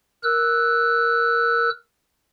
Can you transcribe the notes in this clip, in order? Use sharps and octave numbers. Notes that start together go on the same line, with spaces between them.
A#4 E6 F#6